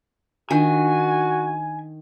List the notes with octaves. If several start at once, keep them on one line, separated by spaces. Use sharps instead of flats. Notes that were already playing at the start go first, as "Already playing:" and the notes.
D#3 D4 F4 F#4 G#5